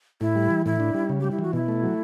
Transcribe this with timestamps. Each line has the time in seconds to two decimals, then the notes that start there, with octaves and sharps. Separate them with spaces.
0.21 A2 E4
0.36 G3
0.50 E3
0.66 A2 E4
0.80 D4
0.94 G3
1.09 C#3
1.20 G3 G4
1.31 E4
1.39 E3 F#4
1.53 B2 E4
1.68 A3
1.83 F#3